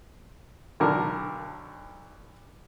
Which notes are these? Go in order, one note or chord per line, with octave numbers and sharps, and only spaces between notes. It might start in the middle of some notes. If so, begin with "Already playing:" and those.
B1 D3 A#4 A5